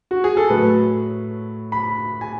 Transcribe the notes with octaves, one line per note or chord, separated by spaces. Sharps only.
F#4
G#4
A4
A2 F#3 B4
B5
G#5